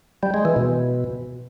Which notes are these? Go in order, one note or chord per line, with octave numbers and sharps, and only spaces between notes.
G3
G#3
E3
B2